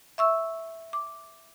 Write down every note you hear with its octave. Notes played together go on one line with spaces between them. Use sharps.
E5 C#6 E6
D6